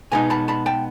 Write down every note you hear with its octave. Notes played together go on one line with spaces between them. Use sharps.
B2 G#3 B3 D#4 G#5 A#5
A5 B5
A5 B5
G5 A5